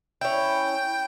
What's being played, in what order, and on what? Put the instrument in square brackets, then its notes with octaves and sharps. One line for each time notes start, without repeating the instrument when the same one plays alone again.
[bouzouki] C#4 E4 [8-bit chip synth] G5